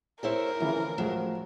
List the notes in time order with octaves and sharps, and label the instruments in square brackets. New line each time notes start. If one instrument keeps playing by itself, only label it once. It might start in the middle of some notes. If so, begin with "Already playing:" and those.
[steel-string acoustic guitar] E4 C5 C#5 [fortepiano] G#4 [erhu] A#4
[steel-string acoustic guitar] D2 [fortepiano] C#3 E3 F3 [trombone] E4
[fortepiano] A2 G#3 [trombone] F3 [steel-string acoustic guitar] F#3